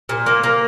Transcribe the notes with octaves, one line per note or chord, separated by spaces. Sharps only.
A#2
A#3
A#3